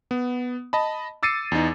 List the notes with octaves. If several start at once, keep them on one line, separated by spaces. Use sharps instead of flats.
B3
D#5 A5 B5
D6 E6 A6 C7 C#7 D#7
E2 D#4